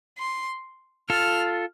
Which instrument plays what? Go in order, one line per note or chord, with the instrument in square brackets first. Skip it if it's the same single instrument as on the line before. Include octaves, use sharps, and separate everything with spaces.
[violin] C6
[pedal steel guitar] F4 A4 [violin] F6